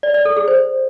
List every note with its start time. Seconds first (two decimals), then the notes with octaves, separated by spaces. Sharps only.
0.03 D5
0.14 D5
0.25 A4
0.37 G#4
0.48 C5